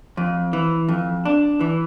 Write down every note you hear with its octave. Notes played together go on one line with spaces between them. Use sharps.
F2
E3
F2
D4
E3